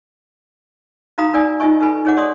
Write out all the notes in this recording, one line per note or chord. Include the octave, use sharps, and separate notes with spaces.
D#4 F#4 F5 A#5 B5 D#6
D#4 A#4 D5 G#5 D#6
D#4 F4 G4 D#5 G#5 C#6
D#4 G4 A4 B4 G#5 B5
D#4 G#4 C#5 D#5 F#5 D6
G4 D5 C6 D6 D#6